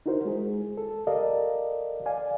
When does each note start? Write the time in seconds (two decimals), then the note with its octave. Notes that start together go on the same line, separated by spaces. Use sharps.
0.06 D#4 E4 F#4 A#4 C5
0.25 G#3 G#4
0.77 A4
1.07 G4 A4 A#4 D5 D#5 F5
2.06 D5 F5 G#5